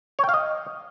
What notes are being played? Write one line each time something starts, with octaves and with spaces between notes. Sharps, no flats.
C#5
G5
F5
D#5